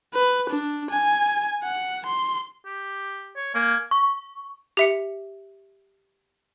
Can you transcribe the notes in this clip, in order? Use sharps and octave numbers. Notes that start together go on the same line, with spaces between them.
B4
D4
G#5
F#5
C6
G4
C#5
A#3 G#5
C#6
G4 E5 C#7